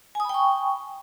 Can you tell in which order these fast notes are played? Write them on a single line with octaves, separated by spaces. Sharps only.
G#5 D#6 B5 G5 C#6